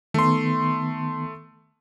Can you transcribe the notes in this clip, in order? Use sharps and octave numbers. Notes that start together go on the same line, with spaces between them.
D#3 A3 B3 C6